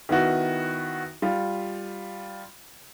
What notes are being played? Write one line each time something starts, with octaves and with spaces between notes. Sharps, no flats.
D#3 B3 E4 F#4
G3 F4